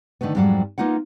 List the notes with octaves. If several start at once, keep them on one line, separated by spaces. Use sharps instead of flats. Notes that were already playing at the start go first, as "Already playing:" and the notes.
D3 D#3 G#3 A3 B3
F2 G#2 F#3 G3 F5 F#5
A#3 B3 D#4 F4 F#5